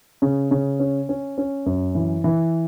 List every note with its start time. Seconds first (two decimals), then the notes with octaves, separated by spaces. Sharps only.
0.22 C#3
0.51 C#3
0.80 C#4
1.09 C#4
1.38 C#4
1.66 F#2
1.95 E3
2.24 E3